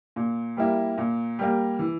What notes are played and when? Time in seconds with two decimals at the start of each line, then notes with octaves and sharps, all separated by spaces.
0.16 A#2
0.57 G3 A#3 E4
0.98 A#2
1.39 G3 A#3
1.79 E3